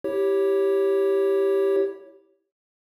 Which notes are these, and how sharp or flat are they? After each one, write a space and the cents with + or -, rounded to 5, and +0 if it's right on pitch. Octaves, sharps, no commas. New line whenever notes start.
E4 -10 G4 +0 C#5 +0